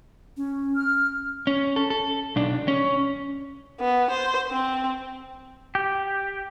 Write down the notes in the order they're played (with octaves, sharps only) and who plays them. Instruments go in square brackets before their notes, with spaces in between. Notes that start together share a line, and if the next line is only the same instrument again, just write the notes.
[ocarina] C#4
[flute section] F6
[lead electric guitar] C#4
A4
A4
B1 D4
C#4
[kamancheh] B3
C5
C4
[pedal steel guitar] G4